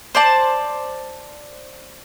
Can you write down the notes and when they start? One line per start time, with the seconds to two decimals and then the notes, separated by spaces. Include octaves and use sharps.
0.15 C5 D5 A5